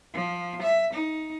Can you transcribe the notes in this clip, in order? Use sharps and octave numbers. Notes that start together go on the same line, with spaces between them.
F3
E5
D#4